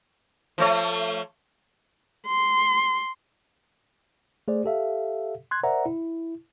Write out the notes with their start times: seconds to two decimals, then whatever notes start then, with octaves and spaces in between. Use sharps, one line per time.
0.58 F3 A3 C#5
2.27 C6
4.48 A3 G#4 C5 D5
4.64 G4 A4 E5 F5
5.51 C6 F#6 G#6
5.63 A#4 C5 D5 E5 F#5 A#5
5.86 E4